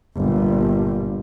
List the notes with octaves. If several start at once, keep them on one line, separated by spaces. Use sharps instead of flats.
G1 A#2